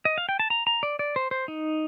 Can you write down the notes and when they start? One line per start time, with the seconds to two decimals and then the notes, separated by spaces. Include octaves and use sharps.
0.05 D#5
0.18 F5
0.29 G5
0.39 A5
0.50 A#5
0.67 A#5
0.83 D5
0.99 D5
1.16 C5
1.31 C5
1.48 D#4